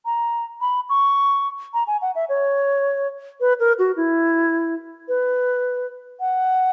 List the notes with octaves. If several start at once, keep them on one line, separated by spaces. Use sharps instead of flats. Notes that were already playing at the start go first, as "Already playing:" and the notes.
A#5
B5
C#6
A#5
G#5
F#5
E5
C#5
B4
A#4
F#4
E4
B4
F#5